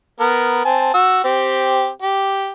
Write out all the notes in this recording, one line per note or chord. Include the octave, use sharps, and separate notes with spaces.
B3 A#4
C4 G#5 A5
F#4 E6
C4 G4
G4